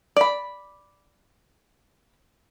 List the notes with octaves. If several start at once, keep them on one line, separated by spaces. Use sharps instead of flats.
D5 B5